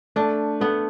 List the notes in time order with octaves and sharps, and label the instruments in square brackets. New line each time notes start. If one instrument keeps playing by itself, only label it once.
[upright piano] A3 [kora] D4
[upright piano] A3 [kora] B3